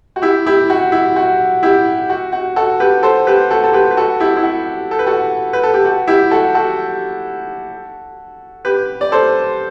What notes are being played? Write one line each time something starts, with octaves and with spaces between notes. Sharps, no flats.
F#4
E4 G4
E4 G4
F#4
E4
F#4
E4 G4
F#4
F#4
F#4 A4
G4 B4
A4 C5
G4 B4
F#4 A4
A4
G4 B4
B4
F#4 A4
E4 G4
E4
F#4
A4
B4
F#4 A4
B4
A4
G4
F#4
E4 G4
F#4 A4
F#4 A4
G4 B4
D5
A4 C5